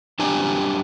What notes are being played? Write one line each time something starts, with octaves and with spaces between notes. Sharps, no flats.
F#2 C4 D4 G4 G#5 A#5